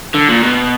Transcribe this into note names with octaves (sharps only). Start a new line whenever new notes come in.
D3
A#2
B2